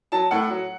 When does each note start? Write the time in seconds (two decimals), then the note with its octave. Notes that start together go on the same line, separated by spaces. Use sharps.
0.12 F#3 A5
0.31 A2 F#5
0.50 F#3